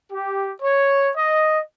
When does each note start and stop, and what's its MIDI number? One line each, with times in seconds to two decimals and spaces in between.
0.12 0.49 67
0.62 1.11 73
1.17 1.60 75